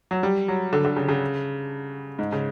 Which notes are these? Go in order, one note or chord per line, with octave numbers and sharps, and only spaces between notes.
F#3
G3
F#3
D3
D3
C#3
C#3
G#2
C#3